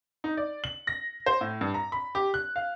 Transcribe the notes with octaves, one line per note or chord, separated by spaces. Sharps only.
D#4
D5
F#7
A#6
C5
A2
G2
A#5
B5
G4
F#6
F5